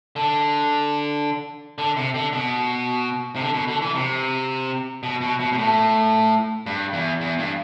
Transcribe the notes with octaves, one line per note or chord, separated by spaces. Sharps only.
D3
D3
C3
D3
B2
C3
D3
B2
D3
E3
C3
B2
B2
B2
B2
A2
G2
E2
E2
G2